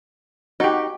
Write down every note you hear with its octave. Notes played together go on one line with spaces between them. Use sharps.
D#4 F#4 G4